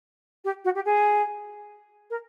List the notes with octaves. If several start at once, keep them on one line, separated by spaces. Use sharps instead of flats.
G4
F#4
G4
G#4
A#4